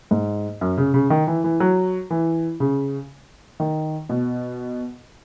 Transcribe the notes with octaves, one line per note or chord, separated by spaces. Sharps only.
G#2
F#2
C#3
C#3
D#3
E3
E3
F#3
E3
C#3
D#3
B2